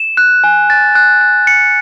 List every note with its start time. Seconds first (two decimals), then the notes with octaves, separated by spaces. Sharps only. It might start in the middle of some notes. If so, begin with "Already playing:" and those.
Already playing: E7
0.17 F#6
0.44 G#5
0.70 A6
0.95 F#6
1.21 F#6
1.47 C#7